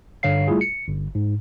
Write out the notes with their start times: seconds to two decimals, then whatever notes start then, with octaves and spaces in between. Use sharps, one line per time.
0.23 G2 D3 C#5 F5 C7
0.48 G3 A3 E4 F4 G#4
0.61 C#7
0.88 G1
1.15 G#2